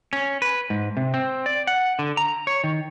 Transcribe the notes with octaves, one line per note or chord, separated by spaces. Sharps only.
C#4
B4
G#2
C3
C4
D5
F#5
D3
A#5
C#5
D#3